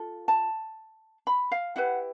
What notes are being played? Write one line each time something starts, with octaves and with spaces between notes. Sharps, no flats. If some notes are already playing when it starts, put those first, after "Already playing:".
Already playing: F4 A4
A5
B5
F5
E4 G4 B4 F#5